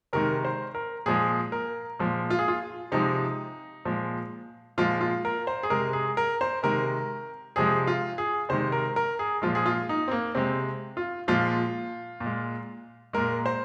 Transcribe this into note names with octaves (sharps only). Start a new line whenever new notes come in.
C3 D#3 G#3 A#4
C5
A#4
A#2 F3 G#3 G#4
A#4
A#2 F3 G#3
F4
G#4
F4
C3 F3 G#3 D#4
A#2 F3 G#3
A#2 F3 G#3 F4
F4
A#4
C5
G#4
C3 G#3 A#4
G#4
A#4
C5
C3 D#3 G#3 A#4
C3 F3 G#3 G#4
F4
G#4
C3 D#3 G#3 C5
A#4
A#4
G#4
A#2 F3 G#3 F4
G#4
F4
D#4
C4
A#3
C3 G#3 C4
F4
A#2 F3 G#3 F4
A#2
G#3
A#2 G#3 A#4
C5